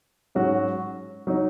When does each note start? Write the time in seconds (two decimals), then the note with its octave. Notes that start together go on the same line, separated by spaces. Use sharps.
0.35 G#2 F#3 C#4 F#4
1.27 F#3 D#4